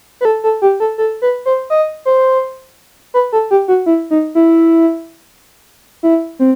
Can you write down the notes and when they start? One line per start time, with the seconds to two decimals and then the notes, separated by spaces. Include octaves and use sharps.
0.21 B4
0.25 A4
0.44 A4
0.62 G4
0.80 A4
0.98 A4
1.22 B4
1.46 C5
1.70 D#5
2.06 C5
3.14 B4
3.33 A4
3.51 G4
3.68 F#4
3.86 E4
4.11 D#4
4.35 E4
6.03 E4
6.39 C4